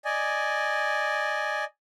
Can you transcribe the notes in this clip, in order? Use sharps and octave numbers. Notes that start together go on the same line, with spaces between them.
D5 D#5 G#5